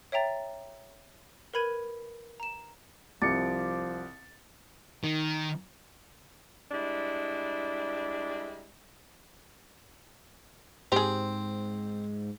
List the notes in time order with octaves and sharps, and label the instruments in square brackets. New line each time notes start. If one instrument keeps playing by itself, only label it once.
[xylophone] C#5 E5 G5 A#5 A6
A#4 B4 B5 G#6 D#7
A#5 E7
[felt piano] C2 [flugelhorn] F3 [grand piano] D6 C#7 [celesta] A6
[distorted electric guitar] D#3
[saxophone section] G3 G#3 D4 E4
[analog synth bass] G#2 [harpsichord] C4 [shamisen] G4 G#4